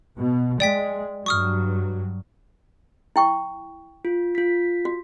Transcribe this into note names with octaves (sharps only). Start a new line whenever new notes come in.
B2
G#3 D5 G5 B6
G2 F#3 C#6 D#6 F6
E4 G5 C#6
F4
F4 B6
F#4